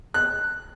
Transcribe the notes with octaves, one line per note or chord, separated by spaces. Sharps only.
F#6